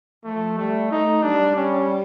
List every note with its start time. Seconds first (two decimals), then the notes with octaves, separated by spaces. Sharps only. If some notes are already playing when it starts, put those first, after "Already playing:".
0.24 F3 A3
0.57 G3 A3
0.91 A3 D#4
1.23 G3 D4
1.56 C#4